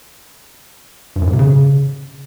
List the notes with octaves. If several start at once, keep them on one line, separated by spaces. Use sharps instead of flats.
G2
F#2
G#2
C3
C#3